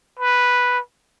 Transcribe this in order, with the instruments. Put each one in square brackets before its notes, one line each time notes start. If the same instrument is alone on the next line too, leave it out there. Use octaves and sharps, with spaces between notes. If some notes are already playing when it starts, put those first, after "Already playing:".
[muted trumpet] B4